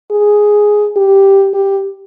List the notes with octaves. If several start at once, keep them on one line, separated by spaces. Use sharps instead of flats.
G#4
G4
G4